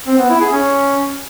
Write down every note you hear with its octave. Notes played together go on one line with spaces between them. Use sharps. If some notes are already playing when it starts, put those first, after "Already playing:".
C4
B3
E4
G#4
C#4